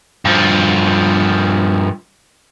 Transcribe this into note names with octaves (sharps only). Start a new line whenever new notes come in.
G2 F3